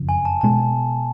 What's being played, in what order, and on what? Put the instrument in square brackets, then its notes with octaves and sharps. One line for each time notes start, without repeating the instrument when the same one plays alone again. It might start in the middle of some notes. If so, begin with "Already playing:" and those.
Already playing: [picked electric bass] F#1 F2 C#3 F3
[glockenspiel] G#5
A5
[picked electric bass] B2 G#3 [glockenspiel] A5